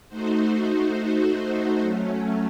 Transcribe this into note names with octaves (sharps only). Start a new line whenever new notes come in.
A3 D#4 F#4 C5
A3 D#4 F#4 C5
F#3 A3 C#4